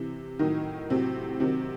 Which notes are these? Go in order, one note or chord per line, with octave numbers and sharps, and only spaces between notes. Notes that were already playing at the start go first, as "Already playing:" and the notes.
Already playing: C3 E3
A2 D#3 F#3 D#4
A2 C3 F#3 C4
C3 D#3 F#3 C4